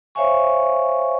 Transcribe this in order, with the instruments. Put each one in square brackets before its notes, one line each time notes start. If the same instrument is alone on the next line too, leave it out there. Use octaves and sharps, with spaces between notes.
[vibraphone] C5 C#5 E5 F5 G#5 C#6